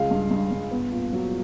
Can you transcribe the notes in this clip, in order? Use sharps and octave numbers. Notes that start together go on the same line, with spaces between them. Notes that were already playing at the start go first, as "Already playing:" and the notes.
Already playing: C#2 G#3 F5
G2
G2
G2
B3
A#2
F#3